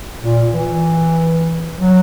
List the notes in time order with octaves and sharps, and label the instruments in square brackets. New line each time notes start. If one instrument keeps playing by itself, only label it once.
[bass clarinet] A#2
E3
F#3